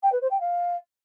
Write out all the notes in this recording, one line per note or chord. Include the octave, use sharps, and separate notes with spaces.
G5
B4
C5
G5
F5